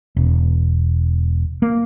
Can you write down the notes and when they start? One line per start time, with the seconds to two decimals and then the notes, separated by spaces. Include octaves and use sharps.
0.16 E1
1.62 A#3